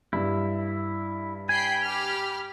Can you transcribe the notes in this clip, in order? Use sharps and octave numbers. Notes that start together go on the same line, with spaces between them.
G2 E4
G5 G#5 B5 C7
G4 B5 F6